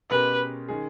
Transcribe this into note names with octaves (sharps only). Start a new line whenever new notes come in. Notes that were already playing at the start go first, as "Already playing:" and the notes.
B2 G#3 C#4 G4 A#4 B4
D#3 G#3 C#4 G#4